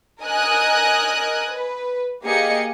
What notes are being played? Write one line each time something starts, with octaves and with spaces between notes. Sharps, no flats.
A#4 D#5 G#5 D#6 F#6
B4
A#3 G4 G#4 D#5 C#7